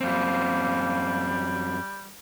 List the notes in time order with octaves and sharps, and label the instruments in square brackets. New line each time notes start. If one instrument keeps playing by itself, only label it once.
[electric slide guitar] F#2 C4 [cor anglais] G3 [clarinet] A#3